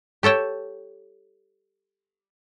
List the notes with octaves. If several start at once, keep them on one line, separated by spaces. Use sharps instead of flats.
G4 A4 C#5 G5 A5